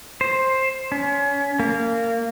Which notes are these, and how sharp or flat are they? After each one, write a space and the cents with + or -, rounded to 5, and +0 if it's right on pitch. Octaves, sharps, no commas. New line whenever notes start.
C5 +10
C#4 +25
A#3 -20